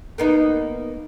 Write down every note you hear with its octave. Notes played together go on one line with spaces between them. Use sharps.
A#3 B3 D#4